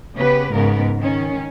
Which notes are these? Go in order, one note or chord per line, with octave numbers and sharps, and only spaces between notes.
C#3 B3 G4 B4
G#2 C#3 B3 A#4
D#3 C#4